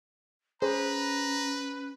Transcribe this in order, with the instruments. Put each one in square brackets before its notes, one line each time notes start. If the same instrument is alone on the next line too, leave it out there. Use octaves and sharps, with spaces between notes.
[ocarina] C#4 [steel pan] G#4 C5 [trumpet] B4 [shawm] A#5